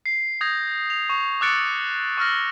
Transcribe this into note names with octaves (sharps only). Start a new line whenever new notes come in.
C7
D#6 G6 G#6 A#6
F7
C#6
D6 E6 F#6 A6 C#7 D7
C#6 E6 F6 A#6